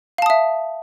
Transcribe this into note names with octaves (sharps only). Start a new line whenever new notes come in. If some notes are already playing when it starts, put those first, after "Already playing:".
E5 F5 A5 D#6